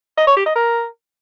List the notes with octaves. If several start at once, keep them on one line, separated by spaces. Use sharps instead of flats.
D#5
C#5
G4
D#5
A#4